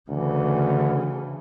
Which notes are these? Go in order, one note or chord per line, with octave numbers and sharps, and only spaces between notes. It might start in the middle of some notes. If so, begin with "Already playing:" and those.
D2 C#3 E3